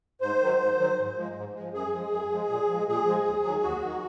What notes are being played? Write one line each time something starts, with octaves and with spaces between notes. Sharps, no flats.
G#2 C5
D#3 F#3
G#2
D#3 F#3
G#2
F3 G#3
G#2
F3 G#3
F#2 G#4
F3 G#3
F#2
F3 G#3
A#2
F3 G#3
A#2 G#4
F3 G#3
D#2
D#3 F#3
D#2 F#4
D#3 F#3